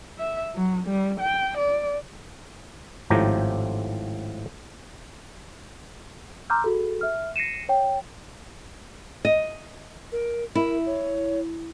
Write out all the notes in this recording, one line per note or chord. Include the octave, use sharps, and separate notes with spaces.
E5
F#3
G3
G5
D5
G#1 A2 F3 G4 A#5
A#5 C6 D6 E6 F6 G6
F#4 G#4 A4
E5 F6
A#6 C7 C#7 D#7 E7
C#5 G5
D#5
A#4
E4 A#4
C#5